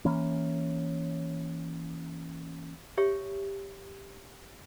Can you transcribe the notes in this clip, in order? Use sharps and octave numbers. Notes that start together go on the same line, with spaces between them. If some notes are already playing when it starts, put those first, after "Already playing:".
E3 A#3 C#4
G4 C#5 E5